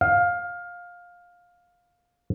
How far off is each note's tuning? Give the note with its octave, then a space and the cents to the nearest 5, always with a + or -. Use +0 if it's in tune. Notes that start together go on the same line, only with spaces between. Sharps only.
F5 +15